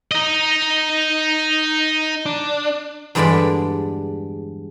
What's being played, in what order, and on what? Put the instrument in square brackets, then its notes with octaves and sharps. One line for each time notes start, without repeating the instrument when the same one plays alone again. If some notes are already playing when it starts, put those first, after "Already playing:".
[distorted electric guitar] D#4 D#5
[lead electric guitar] D4
[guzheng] E2 G2 D3 G#3 D5 B5